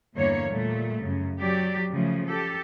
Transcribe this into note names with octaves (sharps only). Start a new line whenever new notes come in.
E2 G2 D3 E3 A#3 C#5
A#2 G3 A3
F#2 C#3
F#3 G4 D5
C#3 F3 A3
G4 A4